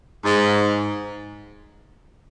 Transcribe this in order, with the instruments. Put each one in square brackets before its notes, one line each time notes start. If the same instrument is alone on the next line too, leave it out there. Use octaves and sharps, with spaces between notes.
[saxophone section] G#2